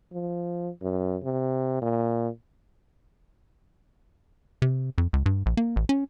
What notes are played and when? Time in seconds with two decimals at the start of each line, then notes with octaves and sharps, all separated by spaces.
0.13 F3
0.82 F#2
1.23 C3
1.82 A#2
4.62 C3
4.98 F2
5.13 C#2
5.26 G2
5.46 A#1
5.57 A#3
5.76 A1
5.89 C#4